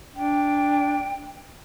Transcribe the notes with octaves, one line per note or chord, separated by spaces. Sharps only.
D4 G5